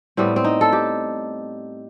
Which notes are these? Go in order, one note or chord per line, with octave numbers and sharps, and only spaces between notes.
A2 G3 B3 C4
C4
D#4
A4
G4